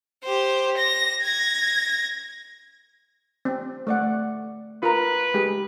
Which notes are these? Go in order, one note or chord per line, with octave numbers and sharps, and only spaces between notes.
G4 C5
A#6
G#6 A#6
C4
A3 D5 F#5
F4 A#4 B4 A#5
G#3 G4 G#4